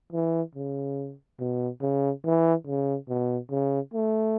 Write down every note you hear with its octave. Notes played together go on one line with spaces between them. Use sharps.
E3
C#3
B2
C#3
E3
C#3
B2
C#3
A3